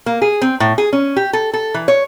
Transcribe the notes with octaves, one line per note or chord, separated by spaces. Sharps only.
A#3
G#4
C4
A2
G#4
C#4
G4
A4
A4
E3
C#5